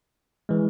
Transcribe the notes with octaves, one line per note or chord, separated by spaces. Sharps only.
E3 G#3